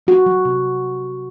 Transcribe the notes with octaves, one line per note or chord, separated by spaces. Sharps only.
F#3 F#4
F#3
C3